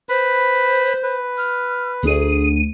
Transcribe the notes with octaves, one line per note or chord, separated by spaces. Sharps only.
B4 C5 B5
B4
F6
D2 G#4 D#7